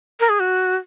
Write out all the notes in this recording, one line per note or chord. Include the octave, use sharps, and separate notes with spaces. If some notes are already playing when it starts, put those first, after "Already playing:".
A#4
G#4
F#4